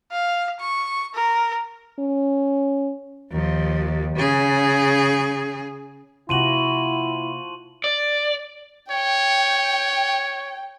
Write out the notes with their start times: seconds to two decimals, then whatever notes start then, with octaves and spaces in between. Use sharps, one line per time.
0.12 F5
0.60 C#6
1.15 A#4
1.99 C#4
3.32 D#2 F3
4.17 C#3 G#4
6.29 C3 F3 A#3 E4 F#4 C6 D#7 F#7
7.84 D5
8.91 C#5 G5